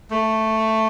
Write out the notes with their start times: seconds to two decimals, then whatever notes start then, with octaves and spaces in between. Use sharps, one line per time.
0.10 A3